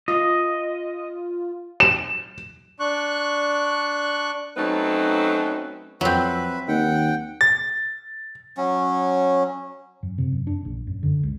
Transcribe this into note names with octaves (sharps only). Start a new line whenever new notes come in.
F4 D#5
E7
D4 C#6 F#6
F#3 A3 C4 C#4 D#4 B4
F2 F#3 C4 B4 E5 F#6
D#2 D#3 F#5 G5
A6
F#3 C#4
F#2
C3
F#2
D4
A#1
F#2
D3
C#2